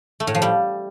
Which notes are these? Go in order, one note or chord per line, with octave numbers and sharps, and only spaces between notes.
A3
A2
F3
G3